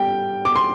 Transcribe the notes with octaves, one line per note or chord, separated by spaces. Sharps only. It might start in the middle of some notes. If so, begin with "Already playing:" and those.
Already playing: G3 G5
D6
C6